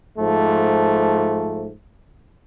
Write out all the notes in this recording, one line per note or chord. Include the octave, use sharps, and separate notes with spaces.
G#2 F3 A3